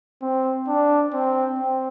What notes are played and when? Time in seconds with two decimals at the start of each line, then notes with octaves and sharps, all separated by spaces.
0.22 C4
0.68 D4
1.14 C4
1.59 C4